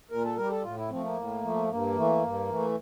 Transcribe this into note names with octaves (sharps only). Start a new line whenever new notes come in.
A#2 A#4
A4
G3 A#4
G4
A4
A2 F4
E4
F3 A3 C4
A#3
A2
F3 A3
G2 A#3
E3 A3
G2
E3 A3